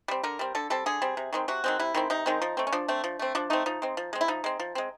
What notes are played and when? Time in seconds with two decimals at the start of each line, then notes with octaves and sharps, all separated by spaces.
0.08 G3 C4
0.23 D3 A#4
0.39 G3 C4
0.55 D3 A4
0.70 G3 C4 A4
0.86 D3 G#4
1.02 G3 C4
1.17 C3
1.33 D#3 G#3 C4
1.48 C3 F#4
1.64 D#3 G#3 C4
1.79 C3 E4
1.94 D#3 G#3 C4
2.10 C3 D#4
2.26 D#3 G#3 C4
2.42 F3
2.57 A3 C4
2.67 C#4
2.72 F3 D4
2.88 A3 C4
3.04 F3
3.19 A3 C4
3.35 F3 D4
3.50 A3 C4 D#4
3.66 F3 D#4
3.82 G#3 C4
3.97 F3
4.13 G#3 C4
4.21 E4
4.28 F3 D#4
4.44 G#3 C4
4.60 F3
4.75 G#3 C4